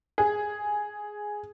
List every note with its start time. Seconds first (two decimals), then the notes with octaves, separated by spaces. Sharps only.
0.18 G#4